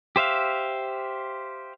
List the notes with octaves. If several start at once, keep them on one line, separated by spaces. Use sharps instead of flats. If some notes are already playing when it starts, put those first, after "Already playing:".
G4 C5 E5 F5